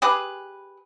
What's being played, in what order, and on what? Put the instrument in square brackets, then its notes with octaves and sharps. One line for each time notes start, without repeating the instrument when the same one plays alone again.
[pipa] G4 G#4 B4